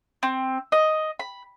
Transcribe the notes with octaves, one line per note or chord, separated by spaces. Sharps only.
C4
D#5
B5